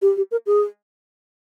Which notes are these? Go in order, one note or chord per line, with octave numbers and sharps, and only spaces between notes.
G4
G4
A#4
G#4